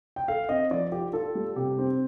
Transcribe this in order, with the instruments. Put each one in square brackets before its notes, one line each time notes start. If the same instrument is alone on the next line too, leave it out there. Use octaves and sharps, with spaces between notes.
[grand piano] G5
[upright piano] A4 [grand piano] F5
[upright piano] C4 [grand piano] D#5
[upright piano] F3 [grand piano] D5
[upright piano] F4 [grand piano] G4
[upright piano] F4 [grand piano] A4
[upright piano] G3
[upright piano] C3 [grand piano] G4
[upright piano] C4